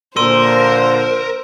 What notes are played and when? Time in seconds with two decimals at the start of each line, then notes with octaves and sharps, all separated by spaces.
0.17 A#2 D3 F3 A#4 C5 C6 E6 D#7